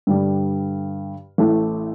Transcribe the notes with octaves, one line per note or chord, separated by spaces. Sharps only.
G2 D3 G3
A1 A2 E3 A3